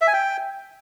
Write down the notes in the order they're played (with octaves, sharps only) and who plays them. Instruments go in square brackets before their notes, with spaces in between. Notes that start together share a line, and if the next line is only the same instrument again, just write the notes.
[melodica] E5
G#5
G5